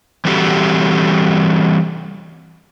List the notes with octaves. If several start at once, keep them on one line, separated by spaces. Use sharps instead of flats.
E3 G3 C4 F#4 G4 A4